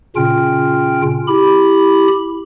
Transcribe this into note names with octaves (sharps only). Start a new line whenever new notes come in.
A#2 C#3 C#4 F4 G5 F6
E4 G4 B5